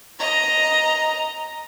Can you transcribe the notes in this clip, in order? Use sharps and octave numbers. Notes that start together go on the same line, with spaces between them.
D#5 A#5